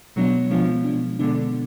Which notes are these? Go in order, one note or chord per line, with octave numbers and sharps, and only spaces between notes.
B2 F#3 G#3 B3 D4
B2 F3 G#3 B3 D4
B2 G#3 B3 D4
B2 D3 G#3 B3 D4